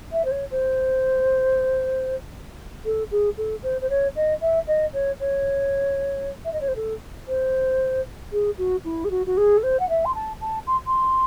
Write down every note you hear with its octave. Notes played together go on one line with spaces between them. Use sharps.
E5
C5
C#5
C5
A4
G#4
A4
C5
C5
C#5
D#5
E5
D#5
C#5
C#5
E5
D#5
C#5
C5
A4
C5
G#4
F#4
E4
G#4
F#4
F#4
G#4
A4
C5
F#5
E5
C6
A5
A5
C6
C6